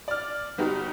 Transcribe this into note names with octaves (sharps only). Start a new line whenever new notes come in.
D5 F6
G1 B3 D#4 F#4 G4